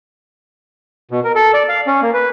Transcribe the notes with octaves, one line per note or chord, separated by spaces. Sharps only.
B2
A#4
A4
D5
F5
C#4
A#3
B4